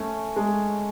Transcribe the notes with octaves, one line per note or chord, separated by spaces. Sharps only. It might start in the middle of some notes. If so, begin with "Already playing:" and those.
Already playing: A3 C#4
G#3